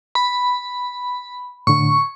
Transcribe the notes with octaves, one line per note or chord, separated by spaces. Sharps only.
B5
A2 D3 C#6